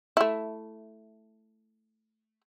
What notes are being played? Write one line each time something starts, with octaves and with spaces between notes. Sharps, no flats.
A3 E4